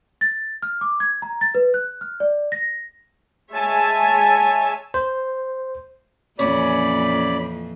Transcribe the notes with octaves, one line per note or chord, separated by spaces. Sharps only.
A6
F6
D6
G#6
A#5
A6
B4
F#6
F6
D5
A#6
G#3 C#5 E5 G#5 A5
C5
F2 A#2 E3 C#4 D5 B5